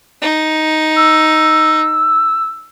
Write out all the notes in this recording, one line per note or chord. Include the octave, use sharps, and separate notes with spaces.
D#4
E6